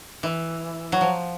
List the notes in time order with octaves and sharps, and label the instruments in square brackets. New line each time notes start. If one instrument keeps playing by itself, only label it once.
[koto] E3
F#3
F3